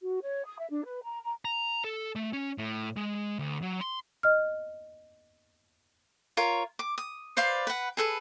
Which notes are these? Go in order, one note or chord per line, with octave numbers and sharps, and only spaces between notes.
F#4
C#5
D#6
E5
D4
B4
A#5
A#5
A#5
A4
A3
C#4
A2
G#3
D2
F#3
C6
D#5 F6
F4 A#4 C#5
D6
D#6
B4 C5 D5 F5
B4 F#5
G#4 A4 B4